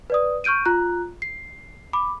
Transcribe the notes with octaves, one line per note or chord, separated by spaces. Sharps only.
B4 D5 D#6
C#6 F6 G6 D7 D#7
F4 A#5 F#6
C7
B5 D6